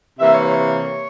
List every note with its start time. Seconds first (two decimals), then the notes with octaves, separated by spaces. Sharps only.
0.19 C3 E3 A#3 E5
0.32 C#5
0.43 C#5